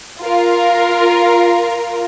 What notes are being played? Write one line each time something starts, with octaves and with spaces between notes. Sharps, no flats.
F4 A#4